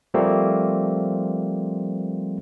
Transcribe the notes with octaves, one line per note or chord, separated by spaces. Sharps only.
F3 G3 A3 A#3 C4